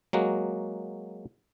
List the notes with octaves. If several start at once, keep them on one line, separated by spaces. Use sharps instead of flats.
F#3 G#3 A#3 F#4